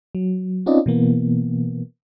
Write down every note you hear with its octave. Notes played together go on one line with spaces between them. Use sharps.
F#3
C4 C#4 D#4 F4 D5 D#5
B2 E3 A#3 B3